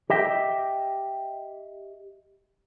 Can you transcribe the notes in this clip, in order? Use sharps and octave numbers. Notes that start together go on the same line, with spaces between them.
G4 D#5 E5 G5